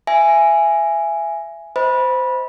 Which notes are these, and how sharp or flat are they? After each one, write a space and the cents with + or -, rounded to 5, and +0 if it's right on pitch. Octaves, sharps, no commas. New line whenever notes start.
E5 +25 G#5 +0
C5 -20 D#5 +40 B5 -20